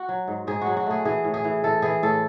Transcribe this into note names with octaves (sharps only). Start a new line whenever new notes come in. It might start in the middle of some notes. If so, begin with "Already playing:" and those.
Already playing: F#4
F#3
G#2
G#2 G#4
F#4
F#3
F#4
A3 G#4
E3 G#4
A2
G#4
E3
E3 A4
E3 G#4
A2 A4